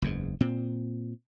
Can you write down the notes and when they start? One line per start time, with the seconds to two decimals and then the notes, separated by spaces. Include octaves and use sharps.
0.02 F#1 E2 G#2
0.41 A#2 C4